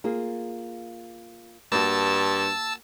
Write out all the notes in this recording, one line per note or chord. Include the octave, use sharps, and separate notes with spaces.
A#3 F4 G#4
G2 A#3 F#4 A5 E6